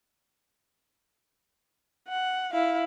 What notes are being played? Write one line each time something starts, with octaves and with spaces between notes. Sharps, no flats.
F#5
E4 F5